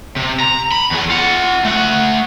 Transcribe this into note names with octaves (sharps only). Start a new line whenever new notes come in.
C3
A#5
B5
E2 G#4
F4 F#5
A3 F#5